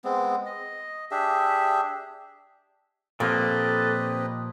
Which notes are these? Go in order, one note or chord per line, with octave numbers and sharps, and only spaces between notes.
G#3 B3 C4
D#5
D4 G4 G#4 E5
A#2 F3 A#3 C4 G4 A4 B4 D#5